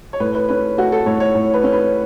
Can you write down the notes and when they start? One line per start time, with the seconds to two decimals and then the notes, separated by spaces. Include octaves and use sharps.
0.13 C#5
0.20 A2 B4
0.35 B4
0.49 C#4 B4
0.78 A3 F#4
0.92 A4
1.06 A2 C#5
1.20 C#5
1.35 A2
1.54 B4
1.63 C#4
1.73 B4